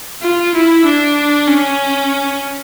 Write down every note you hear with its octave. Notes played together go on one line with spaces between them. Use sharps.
F4
E4
D4
C#4